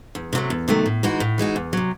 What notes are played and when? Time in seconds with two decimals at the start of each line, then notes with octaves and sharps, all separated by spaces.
0.15 E2
0.33 C3 D#3 F#3 A3
0.50 E2
0.68 C3 D#3 F#3 A3
0.86 A2
1.03 E3 G#3 D#4 F#4
1.20 A2
1.38 E3 G#3 D#4 F#4
1.56 E2
1.73 C3 F#3